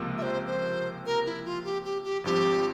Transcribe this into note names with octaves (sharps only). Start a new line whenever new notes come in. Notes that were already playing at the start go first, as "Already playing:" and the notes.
Already playing: C#2 C3 F3 A#3
E5
C5
C5
A#4
E4
F4
G4
G4
G4
G#1 G2 F3 C4 G4